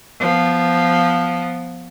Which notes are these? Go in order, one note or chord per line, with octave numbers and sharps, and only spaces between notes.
F3 B3